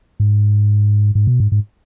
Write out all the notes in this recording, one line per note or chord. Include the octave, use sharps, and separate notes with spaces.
G#2
G#2
B2
G#2
G#2